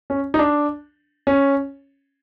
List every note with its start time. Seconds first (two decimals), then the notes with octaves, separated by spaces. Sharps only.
0.10 C#4
0.34 D#4
0.39 D4
1.27 C#4